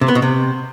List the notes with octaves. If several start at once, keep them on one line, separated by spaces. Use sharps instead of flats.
C3
B3
B2
C3